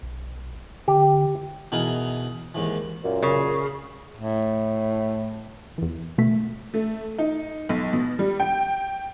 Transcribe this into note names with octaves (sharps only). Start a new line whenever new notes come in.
B1
D3 G4
B2 E3 D#4 E4 G#4 A#4
D#2 G#2 E3
F#2 A#2
C#3
A2
E2 E3
B2 A3 B6
A3
D#4
B1
B2
G3
G5